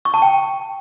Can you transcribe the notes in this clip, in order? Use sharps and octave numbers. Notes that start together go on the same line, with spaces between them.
C#6
A5
G5